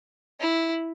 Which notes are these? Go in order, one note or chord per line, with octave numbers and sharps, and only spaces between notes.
E4